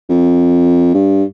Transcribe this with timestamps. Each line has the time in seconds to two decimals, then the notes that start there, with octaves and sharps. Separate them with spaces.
0.09 F2
0.94 G2